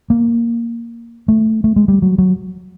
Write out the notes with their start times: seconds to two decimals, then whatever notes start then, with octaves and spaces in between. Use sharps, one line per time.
0.10 A#3
1.28 A3
1.64 A3
1.76 G#3
1.88 G3
2.02 F#3
2.18 F#3